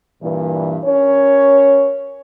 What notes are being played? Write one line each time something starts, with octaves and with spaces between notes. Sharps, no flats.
G2 A#2 E3
C#4 A#4 C#5